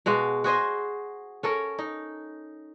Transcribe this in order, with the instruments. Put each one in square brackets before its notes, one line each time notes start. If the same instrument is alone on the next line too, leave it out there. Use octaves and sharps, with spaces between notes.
[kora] B2 G#3 F#4 F5
F#4 G#4 C5 D#5
C#4 A4 A#4 C#5
D#4